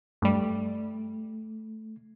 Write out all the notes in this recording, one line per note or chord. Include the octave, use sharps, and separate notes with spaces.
G2 G3 A3